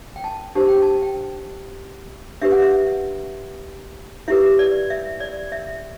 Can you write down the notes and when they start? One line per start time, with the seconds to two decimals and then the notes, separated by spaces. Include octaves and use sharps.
0.16 G5
0.24 A5
0.55 D4 G4 C5 A5
0.68 G5
0.82 A5
1.02 G5
2.42 D4 G4 B4 E5
2.52 F#5
2.62 E5
4.28 E4 G4 B4 E5
4.59 D5
4.90 E5
5.20 D5
5.52 E5